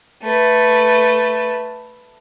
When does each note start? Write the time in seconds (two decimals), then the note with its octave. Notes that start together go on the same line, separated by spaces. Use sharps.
0.23 A3 B4